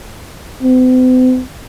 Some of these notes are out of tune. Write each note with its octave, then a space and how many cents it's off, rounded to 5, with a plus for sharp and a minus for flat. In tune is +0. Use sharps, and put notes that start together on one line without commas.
C4 -45